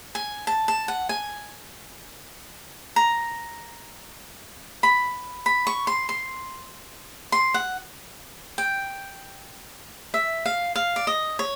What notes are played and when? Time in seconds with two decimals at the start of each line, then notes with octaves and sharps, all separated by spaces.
0.15 G#5
0.47 A5
0.68 A5
0.88 F#5
1.09 G#5
2.96 A#5
4.83 B5
5.46 B5
5.67 C#6
5.87 C6
6.09 C6
7.32 C6
7.54 F#5
8.58 G5
10.14 E5
10.46 F5
10.76 F5
10.96 D5
11.07 D#5
11.39 C#5